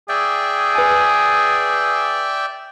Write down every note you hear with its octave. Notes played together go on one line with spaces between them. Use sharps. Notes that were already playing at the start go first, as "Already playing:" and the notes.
G#4 D5 E5 G5
B4 G#5